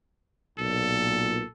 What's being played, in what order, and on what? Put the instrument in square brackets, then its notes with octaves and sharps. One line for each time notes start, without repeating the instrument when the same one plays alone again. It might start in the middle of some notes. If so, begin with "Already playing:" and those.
[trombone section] B1 A#2 [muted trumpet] A4